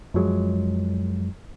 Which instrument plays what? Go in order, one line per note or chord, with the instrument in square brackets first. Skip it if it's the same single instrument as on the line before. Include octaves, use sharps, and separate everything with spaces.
[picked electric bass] F#2 F3 F#3 G#3